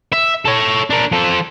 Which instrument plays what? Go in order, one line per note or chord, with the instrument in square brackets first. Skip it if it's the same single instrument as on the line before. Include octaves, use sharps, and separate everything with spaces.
[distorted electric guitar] E5
A4 C#5
D4 A#4
F3 A4